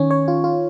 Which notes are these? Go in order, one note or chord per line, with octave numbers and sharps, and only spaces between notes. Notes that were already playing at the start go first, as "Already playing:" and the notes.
Already playing: D#3 C#4 C#5
C#5
F4
F4